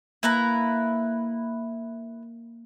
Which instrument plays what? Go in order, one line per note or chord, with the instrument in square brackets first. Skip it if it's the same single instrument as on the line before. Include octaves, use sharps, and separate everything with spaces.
[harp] A#3 [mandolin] E4 B4 A#5